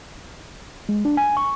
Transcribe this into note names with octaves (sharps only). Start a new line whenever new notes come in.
G#3
D4
G#5
C#6